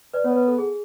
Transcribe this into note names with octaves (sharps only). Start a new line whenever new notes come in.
B4 D5
B3 C#5
B4
A4
G#4